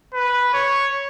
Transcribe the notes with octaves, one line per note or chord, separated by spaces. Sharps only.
B4
C#5